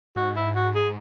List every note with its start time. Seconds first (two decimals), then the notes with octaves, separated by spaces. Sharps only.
0.16 G#2 F#4
0.36 E4
0.55 F#4
0.75 G#4